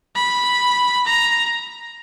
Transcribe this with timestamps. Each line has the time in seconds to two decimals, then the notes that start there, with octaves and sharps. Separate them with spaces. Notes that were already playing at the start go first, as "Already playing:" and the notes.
0.16 B5
1.07 A#5